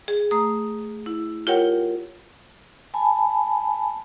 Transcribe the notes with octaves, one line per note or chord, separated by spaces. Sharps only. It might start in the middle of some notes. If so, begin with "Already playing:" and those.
G#4
A3 A#5 D#6
E4
F4 G4 A#4 C#5 F#5 G5
G#5 A5 B5